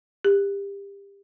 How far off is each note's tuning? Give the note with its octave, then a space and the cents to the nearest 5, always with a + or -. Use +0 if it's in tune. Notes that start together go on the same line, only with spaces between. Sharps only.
G4 +25